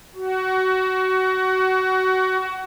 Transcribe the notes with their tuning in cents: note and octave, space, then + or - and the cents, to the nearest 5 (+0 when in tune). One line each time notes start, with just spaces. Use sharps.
F#4 +20